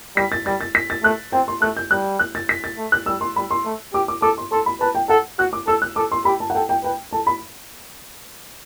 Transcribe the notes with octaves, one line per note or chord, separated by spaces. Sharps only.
G3 B6
A6
G3 A6
A6
B6
A6
A3 F#6
C4 G5
C6
A3 F#6
G6
G3 F#6
F#6
A6
B6
A6
A3
F#6
G3 E6
C6
G3 B5
C6
A3
G4 D6
D6
A4 D6
C6
A4 C6
B5
B4 A5
G5
A4 F#5
F#4 F#6
D6
A4 E6
F#6
A4 D6
C6
G4 B5
A5
F#5
A4 G5
G5
B4 G5
A4 A5
B5